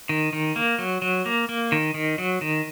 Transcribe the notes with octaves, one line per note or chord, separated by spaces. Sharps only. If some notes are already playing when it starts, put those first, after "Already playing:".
D#3
D#3
A#3
F#3
F#3
A#3
A#3
D#3
D#3
F#3
D#3